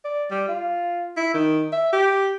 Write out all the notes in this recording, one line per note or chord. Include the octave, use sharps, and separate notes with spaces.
D5
G3
F4
E4
D#3
E5
G4